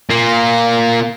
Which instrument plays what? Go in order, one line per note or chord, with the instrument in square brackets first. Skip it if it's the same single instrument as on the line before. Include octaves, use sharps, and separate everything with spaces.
[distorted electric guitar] A#3 F4